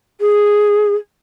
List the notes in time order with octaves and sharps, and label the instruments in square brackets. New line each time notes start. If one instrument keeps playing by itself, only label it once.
[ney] G#4